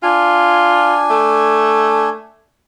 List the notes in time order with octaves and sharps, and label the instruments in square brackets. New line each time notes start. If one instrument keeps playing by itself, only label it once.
[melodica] D4 G#5 [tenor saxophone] F4
[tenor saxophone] A3